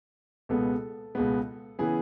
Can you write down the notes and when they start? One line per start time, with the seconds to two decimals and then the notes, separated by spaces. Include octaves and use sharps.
0.49 C#2 B2 G#3 B3 A4
1.15 C#2 B2 G#3 B3
1.79 C#3 E3 B3 G#4